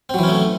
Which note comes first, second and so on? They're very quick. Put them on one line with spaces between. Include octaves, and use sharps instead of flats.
C4 F#3 E3 C#4 A3